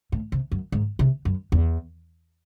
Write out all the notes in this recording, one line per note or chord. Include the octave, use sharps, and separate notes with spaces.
A2
C3
F#2
G#2
C3
F#2
E2